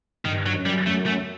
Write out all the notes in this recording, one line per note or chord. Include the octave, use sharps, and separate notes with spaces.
G2 D#3
F#3
F#2
G3
F#2 A3
A3